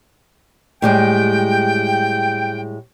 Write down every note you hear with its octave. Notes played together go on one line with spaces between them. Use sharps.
A2 G3 G#3 G5